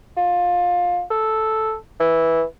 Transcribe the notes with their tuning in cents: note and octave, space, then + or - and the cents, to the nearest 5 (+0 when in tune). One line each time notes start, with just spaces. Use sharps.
F4 +20
A4 -5
E3 -10